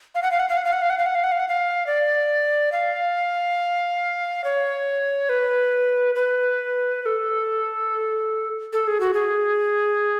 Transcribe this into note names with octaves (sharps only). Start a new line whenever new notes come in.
F5
F#5
F5
F#5
F5
F#5
F5
F#5
F5
F#5
F5
F#5
F5
F#5
F5
F#5
F5
D5
F5
C#5
B4
B4
B4
A4
A4
G#4
F#4
G#4